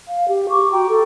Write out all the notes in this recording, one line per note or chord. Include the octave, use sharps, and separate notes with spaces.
F5
G4
C#6 D6
F#4 G5 A#5
A4